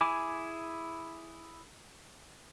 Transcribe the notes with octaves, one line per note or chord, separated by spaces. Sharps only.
E4 G#4 G#5 B5 D6